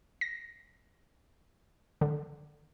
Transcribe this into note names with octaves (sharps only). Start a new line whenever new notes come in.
A#6
D3